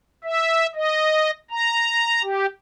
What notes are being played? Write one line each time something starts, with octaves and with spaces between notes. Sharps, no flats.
E5
D#5
A#5
G4